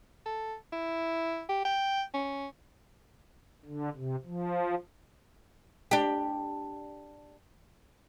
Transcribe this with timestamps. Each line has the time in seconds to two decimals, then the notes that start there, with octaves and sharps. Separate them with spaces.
0.26 A4
0.72 E4
1.49 G4
1.65 G5
2.14 C#4
3.65 D3
3.96 C3
4.25 F3
5.91 D4 G4